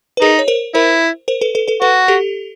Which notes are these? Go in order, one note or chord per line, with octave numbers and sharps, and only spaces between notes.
B4
D#4 G#4 A#4
C#5
A#4 C5
E4 A#4 C5
A#4 C5
A4 B4
A4 B4
A4 B4
F#4 A4 B4
G4 A4